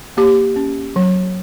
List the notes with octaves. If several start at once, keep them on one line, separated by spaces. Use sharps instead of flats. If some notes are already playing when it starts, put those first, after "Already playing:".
A#3 G4
C#4
F#3